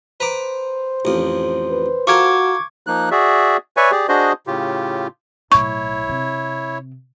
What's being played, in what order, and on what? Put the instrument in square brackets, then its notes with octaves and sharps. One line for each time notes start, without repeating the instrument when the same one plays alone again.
[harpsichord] B4 A#5 D6 [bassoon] C5
[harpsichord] A1 F2
[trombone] B4
[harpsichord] F4 A4 A#4 [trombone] F#4 [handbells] C#6 D6 G#6
[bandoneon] F3 A#3 D#4 F#6
F#4 G#4 D5 E5
B4 C#5 D5 E5 G#5 C#6
G4 G#4 D5
D4 F#4 G#4 C5 D#5
A2 C#3 F4 G4
[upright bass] B1 A2 [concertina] E4 C#5 [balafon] C#6
[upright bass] C3